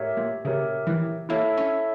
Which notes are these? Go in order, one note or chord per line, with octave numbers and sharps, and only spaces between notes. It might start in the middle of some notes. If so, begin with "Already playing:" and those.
Already playing: A2 G4 A#4 C#5 E5
A#2
C#3 G4 A#4 C#5 E5
E3
A#3 E4 A4 C#5 E5
C#4